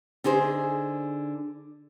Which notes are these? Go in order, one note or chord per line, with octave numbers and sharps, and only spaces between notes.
D3 D#4 G#4 C5